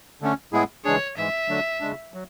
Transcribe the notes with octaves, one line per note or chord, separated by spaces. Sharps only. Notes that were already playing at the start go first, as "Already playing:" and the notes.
D3 A3 C#4
A2 G#3 B3 E4 G#4
C#3 E3 G#3 D4 G#4 C#5
G#2 E3 G#3 E5
D3 F#3 A3 D4
C#3 G#3 D4
F#3